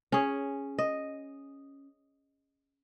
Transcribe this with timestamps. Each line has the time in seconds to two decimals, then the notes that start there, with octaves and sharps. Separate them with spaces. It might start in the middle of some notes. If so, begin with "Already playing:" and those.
0.12 C#4 G#4
0.79 D#5